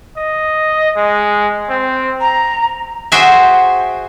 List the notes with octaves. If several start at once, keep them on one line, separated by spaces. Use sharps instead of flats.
D#5
G#3
C4
A#5
F#4 G#4 C5 E5 G5 G#5